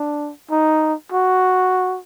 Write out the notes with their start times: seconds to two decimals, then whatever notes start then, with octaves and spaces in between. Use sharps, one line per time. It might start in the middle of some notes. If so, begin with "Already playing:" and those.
Already playing: D4
0.50 D#4
1.12 F#4